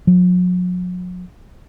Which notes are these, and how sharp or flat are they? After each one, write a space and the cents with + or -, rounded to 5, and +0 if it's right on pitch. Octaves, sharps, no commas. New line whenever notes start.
F#3 -40